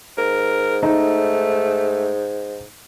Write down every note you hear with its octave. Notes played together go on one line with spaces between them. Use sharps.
G#2 A#4
A3 D#4